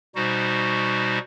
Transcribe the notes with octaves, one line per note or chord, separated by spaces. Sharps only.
B2 G3 D#4 F#4 C5